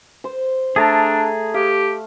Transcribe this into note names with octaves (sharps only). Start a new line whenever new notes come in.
C5
A3 D4 G#4 A5 A#5
G4 F5